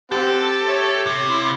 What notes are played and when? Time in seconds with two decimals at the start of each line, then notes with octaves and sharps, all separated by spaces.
0.12 C4 G4 A4 F#5
0.68 C#5 E5
1.07 C3
1.31 E4 C6